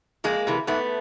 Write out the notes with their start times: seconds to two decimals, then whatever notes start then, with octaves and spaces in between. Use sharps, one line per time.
0.24 F2 G#3 A#3
0.47 C3 E3
0.67 G#2 A3 B3